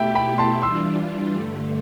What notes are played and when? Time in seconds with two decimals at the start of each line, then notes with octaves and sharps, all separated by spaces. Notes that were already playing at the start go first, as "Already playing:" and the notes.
Already playing: B2 A3 E4 G4 E5 G5 B5
0.15 G5 B5
0.38 A5 C6
0.62 E3 G3 D4 F4 C6 E6
1.34 G2 D3 A3